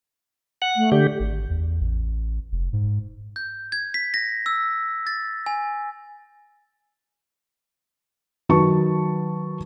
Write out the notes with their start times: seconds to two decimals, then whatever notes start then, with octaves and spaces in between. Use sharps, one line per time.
0.62 F#5
0.76 A3
0.92 D3 G4
1.20 G#1
1.49 E2
1.81 A1
2.52 F1
2.73 G#2
3.36 G6
3.72 G#6
3.94 B6
4.14 A#6
4.46 E6
5.07 A6
5.46 G#5
8.49 D#3 F#3 B4 A5 C#6